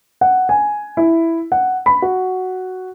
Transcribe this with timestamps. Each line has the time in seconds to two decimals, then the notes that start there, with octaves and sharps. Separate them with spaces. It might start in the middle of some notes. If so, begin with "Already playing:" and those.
0.21 F#5
0.49 G#5
0.97 E4
1.52 F#5
1.86 B5
2.02 F#4